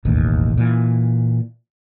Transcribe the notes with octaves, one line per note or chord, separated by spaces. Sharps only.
E1 A1 D#2
A#2 E3